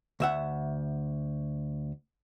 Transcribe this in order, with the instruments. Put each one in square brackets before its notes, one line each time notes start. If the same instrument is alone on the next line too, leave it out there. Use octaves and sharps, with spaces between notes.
[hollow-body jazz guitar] D2 E5 F#5